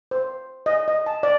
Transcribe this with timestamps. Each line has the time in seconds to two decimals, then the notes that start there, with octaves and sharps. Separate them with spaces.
0.11 C5
0.66 D#5
0.88 D#5
1.06 A5
1.23 D5